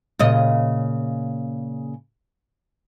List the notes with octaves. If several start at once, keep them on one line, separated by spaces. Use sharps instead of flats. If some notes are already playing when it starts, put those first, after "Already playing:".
A#2 C#3 D#5